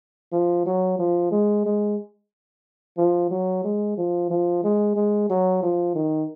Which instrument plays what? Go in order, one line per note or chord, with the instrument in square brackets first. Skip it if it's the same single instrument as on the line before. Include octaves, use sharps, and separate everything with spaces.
[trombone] F3
F#3
F3
G#3
G#3
F3
F#3
G#3
F3
F3
G#3
G#3
F#3
F3
D#3